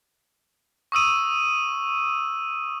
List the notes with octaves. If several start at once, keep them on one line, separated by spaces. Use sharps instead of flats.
C#6 D#6 E6 D#7